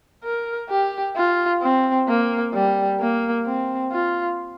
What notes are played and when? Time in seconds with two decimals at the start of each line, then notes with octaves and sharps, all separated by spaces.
0.24 A#4
0.70 G4
1.16 F4
1.62 C4
2.08 A#3
2.54 G3
3.00 A#3
3.46 C4
3.92 F4